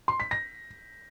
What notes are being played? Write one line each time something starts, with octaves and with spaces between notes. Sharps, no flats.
C6
B6
A#6